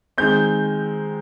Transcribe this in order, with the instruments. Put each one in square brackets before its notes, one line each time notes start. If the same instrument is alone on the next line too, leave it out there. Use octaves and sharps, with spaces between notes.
[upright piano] D#3 G#3 C4 G6